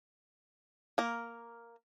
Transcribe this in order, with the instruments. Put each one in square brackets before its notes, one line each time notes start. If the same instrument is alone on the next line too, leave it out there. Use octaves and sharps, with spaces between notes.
[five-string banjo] A#3 A#4